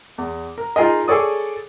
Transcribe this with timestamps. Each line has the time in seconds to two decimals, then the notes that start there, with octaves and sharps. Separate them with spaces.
0.18 E2
0.58 A#4
0.76 D#4 F4 G#4 A#4 D#5
1.08 G#4 A4 C#5 D5 D#6